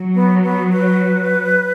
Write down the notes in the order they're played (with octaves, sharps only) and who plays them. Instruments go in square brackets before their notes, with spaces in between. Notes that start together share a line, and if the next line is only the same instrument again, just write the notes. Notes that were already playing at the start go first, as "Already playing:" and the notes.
Already playing: [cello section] F#3
[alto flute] B3
B3
B4